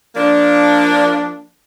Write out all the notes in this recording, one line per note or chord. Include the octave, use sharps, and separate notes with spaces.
F3 A#3 D4